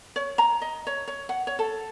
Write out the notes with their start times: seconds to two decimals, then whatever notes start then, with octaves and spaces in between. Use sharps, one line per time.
0.16 C#5
0.38 A#5
0.62 D#5
0.87 C#5
1.08 C#5
1.29 F#5
1.47 C#5
1.59 A4